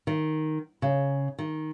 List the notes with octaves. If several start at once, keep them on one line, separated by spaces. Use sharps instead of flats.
D#3
C#3
D#3